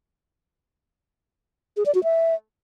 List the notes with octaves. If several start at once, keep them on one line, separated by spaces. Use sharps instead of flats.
G#4
D5
F#4
E5